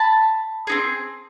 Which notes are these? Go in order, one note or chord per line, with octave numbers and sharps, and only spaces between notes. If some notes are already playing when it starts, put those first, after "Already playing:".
Already playing: A5 B5
C4 D#4 G#4